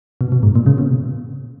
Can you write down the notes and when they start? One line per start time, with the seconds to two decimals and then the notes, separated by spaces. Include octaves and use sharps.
0.21 B2
0.32 B2
0.43 G#2
0.55 A#2
0.66 C#3
0.78 B2